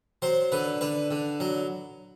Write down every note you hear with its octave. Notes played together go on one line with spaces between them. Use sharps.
F#3 C5
D3 B4
D3 B4
D3
F#3